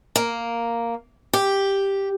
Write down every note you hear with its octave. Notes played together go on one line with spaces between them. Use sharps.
A#3
G4